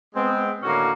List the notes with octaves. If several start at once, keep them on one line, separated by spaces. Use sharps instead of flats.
G#3 B3 C4
A2 D3 D#3 A#3 C#4 F#4